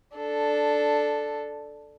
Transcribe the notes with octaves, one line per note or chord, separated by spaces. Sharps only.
D4 A4